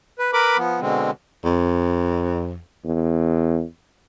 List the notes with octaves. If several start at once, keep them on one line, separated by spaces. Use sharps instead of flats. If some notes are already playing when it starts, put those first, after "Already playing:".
B4
A#4 B4 B5 D6
F3 B3
B2 D3 G#3 C4
F2
E2